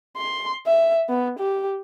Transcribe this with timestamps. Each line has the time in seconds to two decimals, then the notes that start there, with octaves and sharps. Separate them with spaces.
0.17 C6
0.67 E5
1.09 B3
1.39 G4